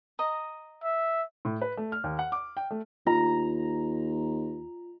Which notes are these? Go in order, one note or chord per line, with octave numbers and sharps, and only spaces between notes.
D#5 A#5
E5
A2
B4
A3
F6
D#2
F#5
D6
G5
A3
D#2 F4 A#5